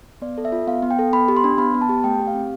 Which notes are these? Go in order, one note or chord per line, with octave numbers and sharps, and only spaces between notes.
B3 D5
A4
E5
F4
B3 F5
B3
G5
A4
B3 B5
G4
C6
D4
B3 B5
B3
A5
G4
A3 G5
G4
F5
C4